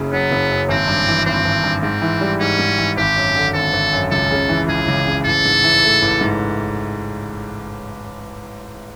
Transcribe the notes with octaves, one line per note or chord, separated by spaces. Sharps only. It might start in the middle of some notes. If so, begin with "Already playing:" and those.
Already playing: F#1 F#2 C#3
F#3 B3
F#1
F#2
G#1 C4
G2
E3
G#1 C4
G#1
G2
G#2 C4
E3
G3
G#2 C#4
G#2
E3
G#1 G4
F#2
D3
G#1 A4
G#1
F#2
C#2 A4
C#3
E3
C#2 G#4
C#2
C#3
A1 A4
G#2
E3
A3
A1
G#2